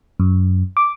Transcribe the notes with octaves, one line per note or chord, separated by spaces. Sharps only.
F#2
D6